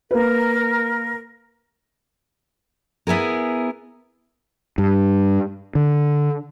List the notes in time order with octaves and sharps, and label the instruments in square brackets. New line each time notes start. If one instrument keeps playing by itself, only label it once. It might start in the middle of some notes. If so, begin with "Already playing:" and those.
[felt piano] A#3 B4 [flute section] A#4
[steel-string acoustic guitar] B3 E4 G#4 A#4
[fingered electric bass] G2
D3